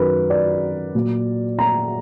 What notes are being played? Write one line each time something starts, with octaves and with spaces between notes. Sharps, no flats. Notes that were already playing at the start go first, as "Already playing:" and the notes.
Already playing: F#2 D#3 F#3 A#4 B4
D5
A#2 F#3
A#5